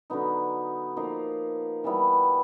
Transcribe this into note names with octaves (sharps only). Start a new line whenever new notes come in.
D3 F#3 B3 D#4
F3 A#3 D#4
E3 G3 B3 E4